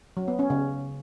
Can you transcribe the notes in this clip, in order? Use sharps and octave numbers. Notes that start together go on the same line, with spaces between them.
F#3
B3
C#4
C#3